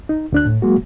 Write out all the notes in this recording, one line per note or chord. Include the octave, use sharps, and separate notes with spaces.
D#4
D2 D4 F#6
A2
F#3 G#3 A#3 F#4